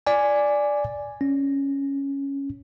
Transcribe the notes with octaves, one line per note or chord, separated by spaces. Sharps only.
D5 G#5
C#4